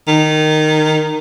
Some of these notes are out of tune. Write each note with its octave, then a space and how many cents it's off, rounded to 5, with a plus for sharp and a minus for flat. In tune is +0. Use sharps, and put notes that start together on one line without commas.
D#3 -10